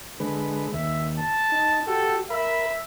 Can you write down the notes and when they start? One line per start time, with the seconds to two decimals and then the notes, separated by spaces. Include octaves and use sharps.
0.20 D3 G#3 B4
0.74 D#2 E5
1.19 A5
1.52 D#4
1.87 F#4 G4 A4
2.30 A#4 E5 B5